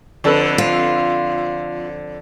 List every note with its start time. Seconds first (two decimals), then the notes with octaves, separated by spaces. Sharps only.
0.24 F2 D3 D4 A4 B4
0.58 F4